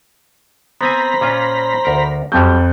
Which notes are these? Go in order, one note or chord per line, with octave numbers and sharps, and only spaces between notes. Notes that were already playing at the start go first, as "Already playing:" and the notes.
B3 C4 C5 G#5 A#5 B5
A#2 C#4 F4
D2 A#4
F2 F#3 G3 G6